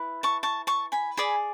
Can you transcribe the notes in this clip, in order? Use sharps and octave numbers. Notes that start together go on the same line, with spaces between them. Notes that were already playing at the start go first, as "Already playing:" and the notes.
Already playing: E4 B4
A5 C#6
A5 C#6
A5 C#6
G#5 B5
G#4 D5 G#5 B5